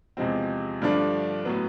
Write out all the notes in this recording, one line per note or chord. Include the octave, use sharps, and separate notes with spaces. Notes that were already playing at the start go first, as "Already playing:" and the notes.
E2 C3 F3 G#3 C4
G2 D3 F3 A3 D4
A2 F#3 B3